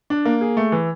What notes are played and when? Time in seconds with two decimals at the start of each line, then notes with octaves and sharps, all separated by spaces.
0.10 D4
0.25 A#3
0.41 G#4
0.57 A3
0.72 E3